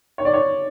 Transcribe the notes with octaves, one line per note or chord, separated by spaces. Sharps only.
C#5
D5
C#5